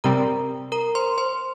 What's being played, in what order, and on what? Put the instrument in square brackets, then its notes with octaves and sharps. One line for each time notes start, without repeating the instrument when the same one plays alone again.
[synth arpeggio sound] C3 G3 C4 [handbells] A#4 A#5
[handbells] A#4 A#5
C5 C6
C5 C6